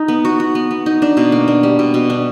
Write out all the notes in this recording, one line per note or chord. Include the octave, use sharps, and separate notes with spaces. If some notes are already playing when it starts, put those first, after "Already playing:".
Already playing: D#4
B3
F#4
F#4
B3
B3
D#4
D4
B2
A#3
D4
G3
B2
B2
D4